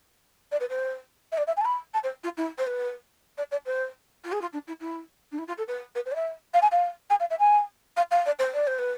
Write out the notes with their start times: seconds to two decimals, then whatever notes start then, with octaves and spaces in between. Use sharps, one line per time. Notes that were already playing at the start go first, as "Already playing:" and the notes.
0.51 D5
0.60 B4
0.70 C5
1.32 E5
1.37 D5
1.47 E5
1.57 G#5
1.61 A5
1.65 B5
1.94 A5
2.03 C5
2.23 F4
2.37 E4
2.58 C5
2.66 B4
3.37 D5
3.51 D5
3.66 C5
4.24 F4
4.32 G#4
4.41 F4
4.53 D4
4.67 E4
4.80 E4
5.32 D4
5.38 E4
5.47 F4
5.58 A4
5.68 B4
5.95 B4
6.05 C5
6.11 D5
6.15 E5
6.54 F5
6.62 G#5
6.72 F5
7.10 G#5
7.20 F5
7.30 E5
7.39 G#5
7.97 F5
8.11 F5
8.26 D5
8.39 C5
8.54 D5
8.67 C5
8.79 B4